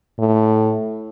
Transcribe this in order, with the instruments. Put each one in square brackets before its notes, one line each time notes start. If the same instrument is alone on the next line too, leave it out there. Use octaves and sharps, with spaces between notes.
[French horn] A2